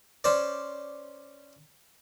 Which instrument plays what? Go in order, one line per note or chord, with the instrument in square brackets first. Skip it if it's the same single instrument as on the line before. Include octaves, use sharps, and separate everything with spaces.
[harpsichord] C#4 C5 D5